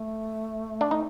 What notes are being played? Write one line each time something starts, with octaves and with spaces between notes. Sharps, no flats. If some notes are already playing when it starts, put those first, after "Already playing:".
Already playing: A3
D4
D#4